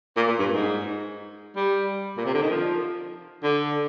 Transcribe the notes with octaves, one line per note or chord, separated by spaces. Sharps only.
A#2
A#2
G2
G#2
G3
A#2
C3
D3
D#3
F3
D3